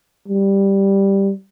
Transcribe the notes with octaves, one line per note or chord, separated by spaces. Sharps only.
G3